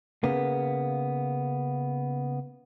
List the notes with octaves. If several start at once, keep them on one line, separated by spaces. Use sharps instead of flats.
C#3 A#3 B3